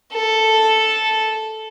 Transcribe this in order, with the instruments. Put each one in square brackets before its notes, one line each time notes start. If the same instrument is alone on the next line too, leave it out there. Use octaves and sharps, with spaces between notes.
[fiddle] A4